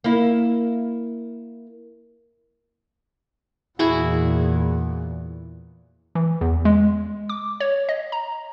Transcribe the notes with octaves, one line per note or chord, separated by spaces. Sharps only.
A#3 E4
E2 A#2 E4 F#4 G#4
E3
E2
G#3
D6
C#5
D#5
A#5